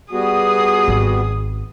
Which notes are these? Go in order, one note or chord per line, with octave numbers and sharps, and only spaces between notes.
G3 B3 F#4 G#4 D#6
G#1